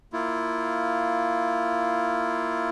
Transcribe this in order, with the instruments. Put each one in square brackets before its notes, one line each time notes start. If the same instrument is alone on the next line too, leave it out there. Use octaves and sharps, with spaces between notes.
[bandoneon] A#3 E4 F4